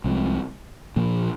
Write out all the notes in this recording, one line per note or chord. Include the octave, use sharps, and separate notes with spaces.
C2 C3 F3 G#3
A#2 F3 A#3